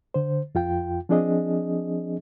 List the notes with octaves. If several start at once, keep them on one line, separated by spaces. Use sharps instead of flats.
D3 C5
F2 F4 G5
F3 C4 D4 G#4 D#5